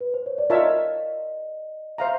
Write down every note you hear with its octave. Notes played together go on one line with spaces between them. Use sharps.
B4
C5
C#5
D5
F4 A#4 C#5 D#5 E5 A5
C5 E5 F5 A#5